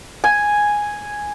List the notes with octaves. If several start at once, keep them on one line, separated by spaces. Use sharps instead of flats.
G#5